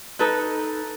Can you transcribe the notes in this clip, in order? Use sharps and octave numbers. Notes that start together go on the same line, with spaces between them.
D#4 A4 B4